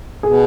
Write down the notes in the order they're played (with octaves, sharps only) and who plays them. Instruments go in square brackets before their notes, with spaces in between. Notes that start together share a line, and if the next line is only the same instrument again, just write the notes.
[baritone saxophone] B2 [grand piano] G#4